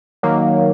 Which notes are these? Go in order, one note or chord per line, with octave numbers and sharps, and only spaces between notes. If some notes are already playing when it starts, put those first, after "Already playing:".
D#3 F#3 A#3